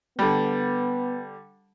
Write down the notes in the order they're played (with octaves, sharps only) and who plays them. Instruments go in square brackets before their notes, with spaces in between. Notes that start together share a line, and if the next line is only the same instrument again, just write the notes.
[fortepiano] D3 G3 [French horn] B3